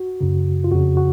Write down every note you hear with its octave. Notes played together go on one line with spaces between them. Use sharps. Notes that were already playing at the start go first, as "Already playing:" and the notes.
Already playing: F#4
F#2 C#3
F4
F2 C#3 F#4
F#4